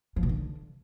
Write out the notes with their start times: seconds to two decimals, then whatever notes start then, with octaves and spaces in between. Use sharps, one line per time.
0.16 F3
0.23 B2
0.29 D3